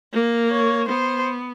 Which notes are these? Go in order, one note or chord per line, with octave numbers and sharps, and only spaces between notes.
A#3
C#5
B3 C5